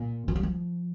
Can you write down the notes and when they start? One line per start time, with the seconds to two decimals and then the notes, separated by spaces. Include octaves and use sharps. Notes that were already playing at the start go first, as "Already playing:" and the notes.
Already playing: A#2
0.28 F3
0.36 G3
0.43 F3